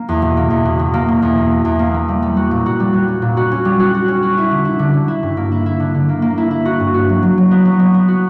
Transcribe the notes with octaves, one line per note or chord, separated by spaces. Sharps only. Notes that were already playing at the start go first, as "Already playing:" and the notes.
Already playing: A#3
E2
B2
A#3
E2
B2
B2
A#3
B2
E2
A#3
A#3
E2
A#3
A#3
G3
G3
F#4
A#2
F#4
G3
F#4
C#4
A#2
F#4
C#4
G3
F#4
F#4
C#4
F#4
E4
D3
E4
D3
D3
E4
G2
A#3
E4
E4
D3
D3
A#3
A#3
E4
E4
F#4
G2
F#4
F#3
F#3
F#3
B3
F#3
B3
B3
F#4